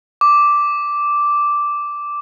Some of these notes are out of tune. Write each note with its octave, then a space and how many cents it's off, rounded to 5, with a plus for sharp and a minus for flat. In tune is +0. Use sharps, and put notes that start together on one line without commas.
D6 -5